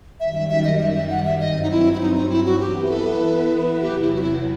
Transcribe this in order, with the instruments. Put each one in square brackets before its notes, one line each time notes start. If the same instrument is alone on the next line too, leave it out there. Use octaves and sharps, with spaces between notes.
[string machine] F#2 D#3 G3 [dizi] E5
[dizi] E5
E5
D#5
E5
E5
F#5
E5
[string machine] G2 F#3 C4 [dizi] D#5
[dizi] D#4
E4
E4
D#4
D#4
E4
F#4
[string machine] E3 B3 E4 B4 [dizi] G4
[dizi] G4
A4
[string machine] E2 C3 F#3 [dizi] G4
[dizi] E4
F#4
E4